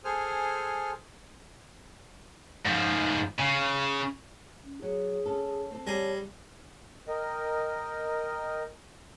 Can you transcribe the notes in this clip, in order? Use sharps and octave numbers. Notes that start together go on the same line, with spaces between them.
G#4 A4 C5 G#5 F6
G#2 F3
C#3
C#4
F#3 G#4
C#4 A4
C4 A4
G3 G#4 C#5 A#5
A#4 D#5 G5